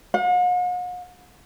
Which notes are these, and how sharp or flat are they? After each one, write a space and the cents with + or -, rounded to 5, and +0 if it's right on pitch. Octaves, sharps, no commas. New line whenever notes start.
F#5 -45